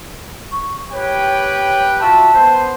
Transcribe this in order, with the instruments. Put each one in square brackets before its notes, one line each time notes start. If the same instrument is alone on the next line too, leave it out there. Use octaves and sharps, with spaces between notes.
[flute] C#6
[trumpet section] G4 B4 G5 [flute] C#5
[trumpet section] F4 F#4 E5 [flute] A5
[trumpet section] B3 C5